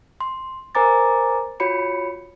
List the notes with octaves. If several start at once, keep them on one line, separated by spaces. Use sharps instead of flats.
C6
A#4 C5 G#5 A#5 D6 A6
F4 F#4 C#5 B5 C#7